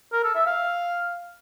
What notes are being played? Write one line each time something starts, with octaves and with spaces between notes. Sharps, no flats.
A#4
A4
E5
F5